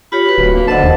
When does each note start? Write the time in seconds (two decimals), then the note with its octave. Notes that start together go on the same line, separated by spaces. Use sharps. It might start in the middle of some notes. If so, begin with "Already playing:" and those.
0.12 F4 G4 C#5 B5
0.26 F#4 B4
0.38 D1
0.54 A#3
0.67 D3 C5 D#5 F#5 A5
0.84 D#2